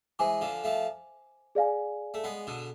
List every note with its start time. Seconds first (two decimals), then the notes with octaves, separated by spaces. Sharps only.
0.19 E3 G#3 C5 G#5 D6
0.41 D3 F3
0.64 F3 A3
1.55 G#4 D5 F5 G#5
2.14 A3
2.24 G#3 B3
2.47 B2 D3